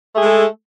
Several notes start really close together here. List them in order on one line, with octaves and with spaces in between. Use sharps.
A3 G#4 G#3 A4